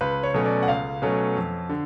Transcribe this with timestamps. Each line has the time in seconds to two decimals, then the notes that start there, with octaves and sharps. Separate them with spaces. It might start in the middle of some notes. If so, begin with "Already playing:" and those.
0.01 C#2 B4
0.23 C#5
0.34 B2 F#3 A3 C#4
0.46 D5
0.63 F#5
0.68 C#2 F5
1.02 B2 F#3 A3 C#4
1.36 F2
1.69 D3